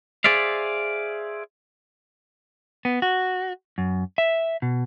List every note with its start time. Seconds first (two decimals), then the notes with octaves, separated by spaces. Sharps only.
0.24 G#4 C5 D5 E5 F5
2.85 B3
3.02 F#4
3.78 F#2
4.18 E5
4.62 B2